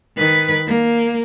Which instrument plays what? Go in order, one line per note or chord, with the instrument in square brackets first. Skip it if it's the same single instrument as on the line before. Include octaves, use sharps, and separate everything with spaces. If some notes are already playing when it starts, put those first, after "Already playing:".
[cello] D#3 B4
A#3